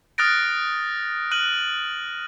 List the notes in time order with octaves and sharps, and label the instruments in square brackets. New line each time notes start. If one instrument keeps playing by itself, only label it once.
[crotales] D#6 F6 F#6 A6 A#6 D7
F6 F#6 D#7 F#7